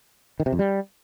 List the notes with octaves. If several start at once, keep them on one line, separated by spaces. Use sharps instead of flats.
D#3
C3
F2
G3